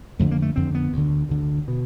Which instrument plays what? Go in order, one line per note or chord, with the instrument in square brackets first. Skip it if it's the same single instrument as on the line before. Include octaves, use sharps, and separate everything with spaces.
[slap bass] F2 D3 A3
A#3
A3
F2 D3 C4
B3
D2 D3
D2 D3
B2